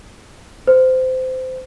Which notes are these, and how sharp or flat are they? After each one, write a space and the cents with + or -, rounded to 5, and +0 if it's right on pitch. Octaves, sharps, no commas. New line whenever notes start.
C5 -20